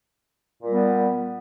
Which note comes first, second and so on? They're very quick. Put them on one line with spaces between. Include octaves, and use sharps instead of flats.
A#2 G3 B3